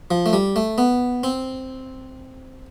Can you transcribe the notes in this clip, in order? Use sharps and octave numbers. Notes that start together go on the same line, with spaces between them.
F3
A3
G3
A3
B3
C4